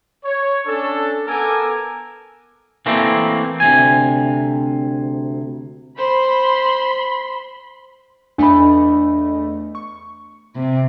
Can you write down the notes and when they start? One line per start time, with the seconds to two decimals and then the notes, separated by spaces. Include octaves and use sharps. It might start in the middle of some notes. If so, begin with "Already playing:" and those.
0.25 C#5
0.67 C#4 D4 A4
1.27 B3 A4 A#4 G#5 D6
2.86 E3 A3 A#3 C4
3.60 D2 C3 G#5
5.98 C5 B5 C6
8.38 E2 A3 D4 D#5 B5
9.75 C#6
10.56 C3